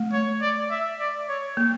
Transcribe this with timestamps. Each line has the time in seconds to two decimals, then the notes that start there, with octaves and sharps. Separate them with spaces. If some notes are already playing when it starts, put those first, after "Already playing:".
Already playing: A3
0.12 C#5
0.41 D5
0.71 E5
1.00 D5
1.29 C#5
1.57 A#3